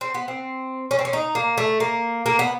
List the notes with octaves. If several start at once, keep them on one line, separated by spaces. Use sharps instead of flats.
C4
B3
C4
C#4
C4
C#4
D#4
A#3
A3
A#3
A#3
B3